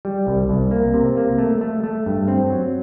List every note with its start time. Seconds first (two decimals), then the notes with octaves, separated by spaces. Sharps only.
0.05 G3
0.27 C2
0.49 C2
0.71 A#3
0.94 C3
1.17 A#3
1.39 A3
1.61 A3
1.84 A3
2.06 G2
2.28 C4
2.50 F#3